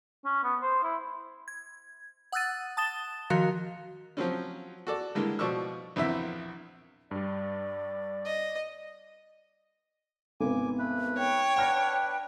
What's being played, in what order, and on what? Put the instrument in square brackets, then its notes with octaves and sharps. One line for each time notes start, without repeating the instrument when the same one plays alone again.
[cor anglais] C#4
B3
C5
E4
[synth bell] G#6
F#5 D#6 E6 F#6 A6 D#7
A5 D#6 A6 E7 G7
D#3 F3 F#4 A#4 F5
[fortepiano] F3 F#3 C4 C#4
F#4 A4 D5
D3 E3 G3 G#3 A#3
B2 F3 D5 C#6 E6
A#1 E2 C4 E4 E5
[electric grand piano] G2 G3 [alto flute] D5
[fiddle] D#5
[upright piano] G#1 C3 B3 [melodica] G#5 D6
[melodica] A3 B4
[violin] C#5 [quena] G5
[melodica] D4 B4 [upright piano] F#5 F6 A#6